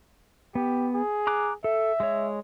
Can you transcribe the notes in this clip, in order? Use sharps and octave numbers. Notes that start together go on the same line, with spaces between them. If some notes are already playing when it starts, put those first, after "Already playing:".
B3 G4
G#4
A#5 D6 F#6
A4 E5
G#3 C#5